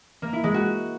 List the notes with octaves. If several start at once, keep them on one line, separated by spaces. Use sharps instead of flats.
A#3
E4
G#3
F#4